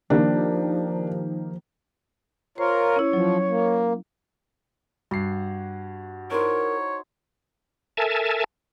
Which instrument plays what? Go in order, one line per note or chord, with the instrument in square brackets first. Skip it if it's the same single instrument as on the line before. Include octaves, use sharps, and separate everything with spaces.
[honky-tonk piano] D#3 A#3 G4 [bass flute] F3 [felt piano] D4
[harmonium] F4 A#4 [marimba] C5 [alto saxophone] C#5
[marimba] C#4 E4
[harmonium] F3 [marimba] F#3
[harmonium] A#3
[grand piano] G2 C7 [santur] F#4
[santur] D#4 E4 C5 [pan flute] A#4 [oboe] C#5
[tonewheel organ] A4 A#4 E5 G#5 A5